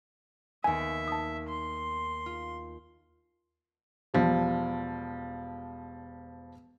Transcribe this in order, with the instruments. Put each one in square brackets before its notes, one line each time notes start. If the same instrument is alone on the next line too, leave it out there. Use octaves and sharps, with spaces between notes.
[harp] D#2 B3 [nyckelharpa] E5 [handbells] G#5
[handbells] A5 D#6
[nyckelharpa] C6
[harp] F4
[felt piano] E1 F3 G3